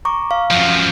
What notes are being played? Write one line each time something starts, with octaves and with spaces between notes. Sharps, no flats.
A#5 C#6 D6
F5
F#2 F3